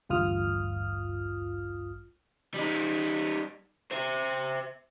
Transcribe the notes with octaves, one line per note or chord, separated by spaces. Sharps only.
A1 D2 G2 F4 D#6 F6
G3 D#4
C5 E5